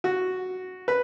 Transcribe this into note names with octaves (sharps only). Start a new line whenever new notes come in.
F#4
B4